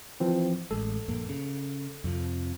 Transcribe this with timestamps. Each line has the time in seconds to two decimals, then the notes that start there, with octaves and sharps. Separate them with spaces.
0.20 E3 F3 C4
0.71 A1 G#3 A4
1.08 A#1 G2 A#3
1.29 C#3
2.04 F2 C3 F3